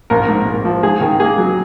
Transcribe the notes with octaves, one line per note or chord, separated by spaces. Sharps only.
A#1 A#4
G#2
A#1
F3
G#2 G#4
D#3
A#3 G#4
F#3